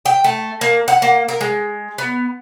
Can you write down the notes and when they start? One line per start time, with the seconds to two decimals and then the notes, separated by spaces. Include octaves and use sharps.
0.05 G5
0.24 A3
0.61 A#3
0.88 F#5
1.02 A#3
1.28 A#4
1.41 G#3
1.98 B3